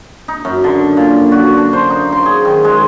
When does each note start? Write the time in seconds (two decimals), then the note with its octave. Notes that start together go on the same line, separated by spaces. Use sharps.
0.28 D#4
0.45 F#2
0.64 D3
0.97 A#2
1.32 F#4
1.57 D4
1.73 C5
1.90 D#4
2.12 C6
2.26 G#4
2.45 D#3
2.64 G#3